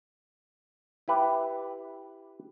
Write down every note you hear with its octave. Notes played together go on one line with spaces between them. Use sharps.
E4 G4 B4